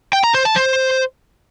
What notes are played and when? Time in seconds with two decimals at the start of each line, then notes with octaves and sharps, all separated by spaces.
0.13 G5
0.24 A#5
0.34 C5
0.45 A5
0.56 C5